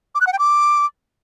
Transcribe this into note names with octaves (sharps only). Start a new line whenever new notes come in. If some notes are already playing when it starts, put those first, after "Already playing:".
D6
F#6
F#5
G5
D6